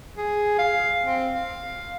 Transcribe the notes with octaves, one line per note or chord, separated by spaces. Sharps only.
G#4
F5
C4
F5